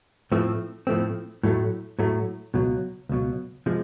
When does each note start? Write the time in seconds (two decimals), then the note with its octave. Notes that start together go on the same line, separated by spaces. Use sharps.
0.32 A2 F3 A3 C4
0.87 A2 F3 A3 C4
1.43 A2 F#3 A3
1.99 A2 F#3 A3
2.54 C#2 B2 F#3
3.09 C#2 B2 F#3
3.66 C3 F3 G#3